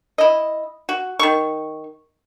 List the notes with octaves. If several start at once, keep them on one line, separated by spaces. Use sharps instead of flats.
E4 D#5
F#4
D#3 C#6